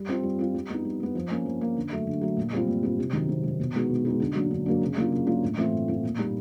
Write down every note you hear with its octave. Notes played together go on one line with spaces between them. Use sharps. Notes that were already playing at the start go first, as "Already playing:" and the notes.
Already playing: G3
C4 F4
G3
C4 F4
G3
B3 D#4
G3
B3 D#4
F3
A#3 C#4
F3
A#3 C#4
D3
F#3 A3
D3
F#3 A3
A#2
G3 C4 F4
A#2
G3 C4 F4
C3
D#3 F#3
C3
D#3 F#3
B2
G#3 B3 D#4 F#4
B2
G#3 B3 D#4 F#4
D3
F#3 A#3 D4
D3
F#3 A#3 D4
C#3
F#3 A#3 D4 F4
C#3
F#3 A#3 D4 F4
A2
E3 A3 C4 F4
A2
E3 A3 C4 F4
A#2
G3 A#3 D#4